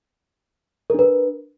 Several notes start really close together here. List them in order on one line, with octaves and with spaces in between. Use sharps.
A#4 D4 B4